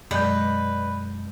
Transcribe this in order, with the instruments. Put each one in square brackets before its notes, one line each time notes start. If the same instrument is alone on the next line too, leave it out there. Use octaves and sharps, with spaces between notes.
[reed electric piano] F#2 G6 [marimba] B2 G#3 [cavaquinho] B4 [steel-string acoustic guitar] D5 D#5